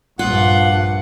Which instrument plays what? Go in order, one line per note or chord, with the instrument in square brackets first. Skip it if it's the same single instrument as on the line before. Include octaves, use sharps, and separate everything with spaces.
[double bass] A#1 G2 [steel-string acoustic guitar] F4 [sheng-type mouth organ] F#5